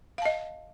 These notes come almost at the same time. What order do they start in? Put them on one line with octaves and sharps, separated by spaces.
F5 A5 D#5